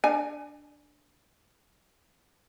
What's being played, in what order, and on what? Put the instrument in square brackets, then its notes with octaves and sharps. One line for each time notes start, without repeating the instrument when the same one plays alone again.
[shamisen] D4 G#5